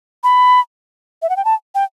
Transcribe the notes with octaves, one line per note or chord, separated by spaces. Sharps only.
B5
E5
F#5
G5
A5
G5